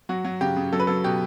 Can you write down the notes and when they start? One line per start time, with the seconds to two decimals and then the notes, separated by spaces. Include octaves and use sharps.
0.09 F#3 F#4
0.25 F#3
0.41 C#3 G4
0.56 C#3
0.72 F#3 A4
0.80 B4
0.87 F#3 A4
1.04 B2 G4